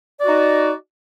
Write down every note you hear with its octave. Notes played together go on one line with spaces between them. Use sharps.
D#4 F#4 D5